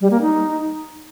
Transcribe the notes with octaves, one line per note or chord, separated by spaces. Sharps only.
G3
A#3
D#4